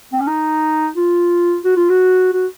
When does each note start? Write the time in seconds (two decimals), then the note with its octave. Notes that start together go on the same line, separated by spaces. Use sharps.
0.13 C4
0.20 C#4
0.28 D#4
0.96 F4
1.64 F#4
1.77 F4
1.89 F#4
2.33 F#4